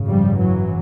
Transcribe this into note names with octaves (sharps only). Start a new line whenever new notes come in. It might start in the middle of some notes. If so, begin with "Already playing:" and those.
Already playing: G#1 F#2 C#3
F3 G3
E3 F#3